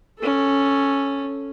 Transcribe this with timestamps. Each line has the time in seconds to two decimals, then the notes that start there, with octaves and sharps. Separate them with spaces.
0.19 C#4 A4